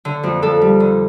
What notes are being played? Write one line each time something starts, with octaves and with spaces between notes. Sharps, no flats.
D3
F2
F2 A4
G3
D3